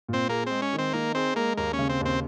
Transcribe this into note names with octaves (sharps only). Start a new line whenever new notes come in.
A#2 C4
A#3 G#4
G#3 C4
C#4
D#3
C4
A#3 D#4
C4 G#4
G#3 A#3
D#2 A#3
C#4
C#3
C4
D#2 C4